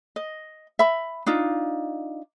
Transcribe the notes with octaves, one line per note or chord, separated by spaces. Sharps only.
D#5
E5 B5
D4 D#4 F4